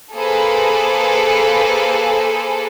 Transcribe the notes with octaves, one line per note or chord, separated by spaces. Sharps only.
A#3 G#4 A4 B4 C5